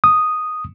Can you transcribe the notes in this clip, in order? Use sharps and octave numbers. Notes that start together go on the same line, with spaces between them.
D#6